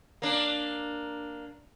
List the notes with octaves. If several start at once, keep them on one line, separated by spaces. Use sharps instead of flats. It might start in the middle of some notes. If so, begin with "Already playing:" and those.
A#3 D4